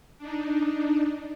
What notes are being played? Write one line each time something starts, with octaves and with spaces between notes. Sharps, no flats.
D4 D#4